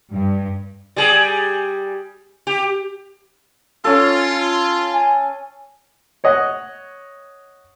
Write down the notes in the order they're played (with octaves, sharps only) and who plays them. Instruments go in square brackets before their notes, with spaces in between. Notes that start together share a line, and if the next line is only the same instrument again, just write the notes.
[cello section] G2
[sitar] G3 G#4
G4
[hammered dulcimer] C#4 A4 [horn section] F4
[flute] G#5
[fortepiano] C#5 D#5 F#5